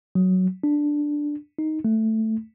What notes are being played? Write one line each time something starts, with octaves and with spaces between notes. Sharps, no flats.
F#3
D4
D#4
A3